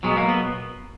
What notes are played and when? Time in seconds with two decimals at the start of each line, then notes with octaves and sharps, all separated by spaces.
0.03 B2 F#3 G#3
0.11 B3
0.17 A#3
0.28 B3